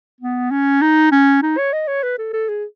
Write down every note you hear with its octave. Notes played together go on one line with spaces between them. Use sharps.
B3
C#4
D#4
C#4
D#4
C#5
D#5
C#5
B4
A4
A4
G#4